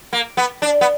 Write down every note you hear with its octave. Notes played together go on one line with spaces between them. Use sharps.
A#3
B3
D4
B3